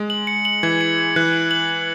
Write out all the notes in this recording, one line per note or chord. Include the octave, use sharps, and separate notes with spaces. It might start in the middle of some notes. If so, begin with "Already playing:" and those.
Already playing: G#3
F#7
C#7
F#7
E3 G#6
C#7
G#6
E3 F#6
F#7
F#7
F#7